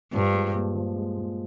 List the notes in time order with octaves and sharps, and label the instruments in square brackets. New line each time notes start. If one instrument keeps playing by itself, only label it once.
[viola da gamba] G2 [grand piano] F3
[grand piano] G#3
A#2
F3
G#3
A#2